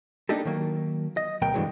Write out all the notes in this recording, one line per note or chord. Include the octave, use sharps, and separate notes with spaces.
A#3 D4 D#4 G4 A4
D#3 F#3 A#3
D#5
D2 B2 F#3 A#4 G5
G2 A#2 D3 E3 F#3 G#3